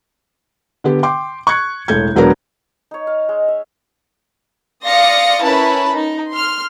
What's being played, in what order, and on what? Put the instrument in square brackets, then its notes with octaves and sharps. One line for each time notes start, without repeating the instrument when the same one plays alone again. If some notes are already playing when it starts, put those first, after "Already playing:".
[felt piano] D3 B3 G4
G5 C6 D6
C#6 F#6 G#6 C#7
E1 A1 A4 G6 G#6
E1 F#3 B3 D4 A#4
[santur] D#4 C#5
F5
G#3
E5
[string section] D5 F5 C6 D#6 A#6 C#7
C#4 E4 A#4 B4 A5 B5
D#4
C6 F6